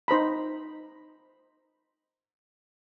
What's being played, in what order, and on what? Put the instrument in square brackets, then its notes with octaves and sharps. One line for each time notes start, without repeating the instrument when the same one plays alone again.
[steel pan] D#4 C5 A#5 B5